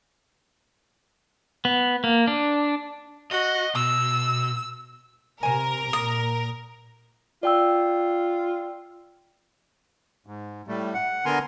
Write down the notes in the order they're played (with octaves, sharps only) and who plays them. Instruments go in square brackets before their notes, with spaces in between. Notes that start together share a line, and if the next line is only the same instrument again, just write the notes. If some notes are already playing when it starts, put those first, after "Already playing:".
[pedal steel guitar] B3
A#3
D4
[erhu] F#4 [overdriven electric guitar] D#5
[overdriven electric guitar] B2 [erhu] E6
[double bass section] C3 [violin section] A#4 [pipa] C5 G#5
[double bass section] A#2 [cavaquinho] D#6
[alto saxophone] F4 [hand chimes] D5 G5 E6
[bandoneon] G#2
A2 G3 A3
F#5
D3 B3 A#4 G#5 A#5 C6